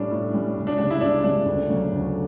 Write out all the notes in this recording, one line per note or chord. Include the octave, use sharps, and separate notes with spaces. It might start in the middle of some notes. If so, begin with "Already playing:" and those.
Already playing: A2 G3 C#4 D4
A2
G3 C#4
C#2
D4
C#3 G3 C#4 D4
E4
C#2 D4
C#3 G3 C#4 D4
D2
C#3 F#3 A3 C#4
D2